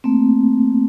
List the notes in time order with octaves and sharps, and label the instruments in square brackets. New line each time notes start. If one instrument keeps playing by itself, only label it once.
[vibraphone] A3 A#3 C4